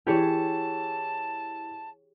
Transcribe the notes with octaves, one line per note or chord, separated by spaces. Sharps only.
E3 G4 G#4 C#5 A5